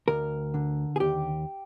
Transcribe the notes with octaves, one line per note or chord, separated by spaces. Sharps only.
D2 A#4
D3
G#4
D#2 G4